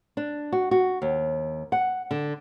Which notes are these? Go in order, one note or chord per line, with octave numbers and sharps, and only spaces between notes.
D4
F#4
F#4
D#2
F#5
D3